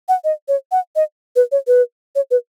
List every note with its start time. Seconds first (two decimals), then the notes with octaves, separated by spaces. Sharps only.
0.09 F#5
0.24 D#5
0.48 C#5
0.72 F#5
0.96 D#5
1.36 B4
1.52 C#5
1.67 B4
2.15 C#5
2.31 B4